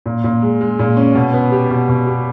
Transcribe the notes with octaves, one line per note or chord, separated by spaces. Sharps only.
A#2
A#2
G#3
G#3
A#2
C#4
B2
B3
G4
B2
B2
G4